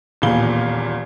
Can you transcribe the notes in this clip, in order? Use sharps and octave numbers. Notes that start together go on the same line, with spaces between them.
D#1 E2 A#2 G#4 F5 G7